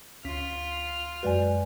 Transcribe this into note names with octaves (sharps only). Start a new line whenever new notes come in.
D2 C#4 F4 F6 B6
F#2 G#3 F#4 B4 D5 G#5